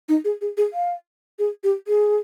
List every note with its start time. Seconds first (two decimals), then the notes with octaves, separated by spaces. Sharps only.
0.09 D#4
0.24 G#4
0.41 G#4
0.57 G#4
0.73 F5
1.39 G#4
1.64 G4
1.88 G#4